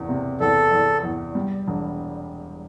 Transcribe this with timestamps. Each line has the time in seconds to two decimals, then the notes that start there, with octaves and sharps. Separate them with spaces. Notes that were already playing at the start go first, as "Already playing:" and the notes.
Already playing: F#1 E2
0.09 C3
0.40 E2 A4
0.72 E2
1.03 E2
1.35 G3
1.67 E1